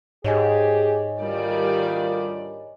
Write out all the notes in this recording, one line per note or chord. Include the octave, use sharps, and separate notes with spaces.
G#2 G4 G#4 C#5 D#5 G#5
D2 D#3 G3 D4 F4 D5